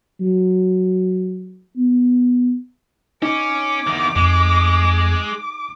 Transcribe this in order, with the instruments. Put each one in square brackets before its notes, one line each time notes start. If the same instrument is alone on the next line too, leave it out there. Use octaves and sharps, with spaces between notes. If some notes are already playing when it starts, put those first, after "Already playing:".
[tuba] F#3
B3
[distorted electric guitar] C#4 [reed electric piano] D#4 [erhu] D6
[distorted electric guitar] E2 D#3
[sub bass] F2 [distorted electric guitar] G#3